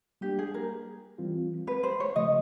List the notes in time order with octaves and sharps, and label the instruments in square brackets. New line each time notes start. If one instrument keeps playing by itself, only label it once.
[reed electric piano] G3 A#3 D4 [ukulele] G4
[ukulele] G#4
A#4
[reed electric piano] E3 G3 C4 F4
[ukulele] B4
C5
C#5
[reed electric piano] C#3 F3 A3 [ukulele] D#5